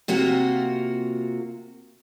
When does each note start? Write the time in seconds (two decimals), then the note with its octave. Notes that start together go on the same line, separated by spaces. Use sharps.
0.08 C3 A#3 F4 F#4